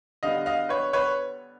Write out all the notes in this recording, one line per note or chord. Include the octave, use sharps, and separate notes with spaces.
D3 G3 B3 D#5 F5
D#5 F5
B4 C#5
B4 C#5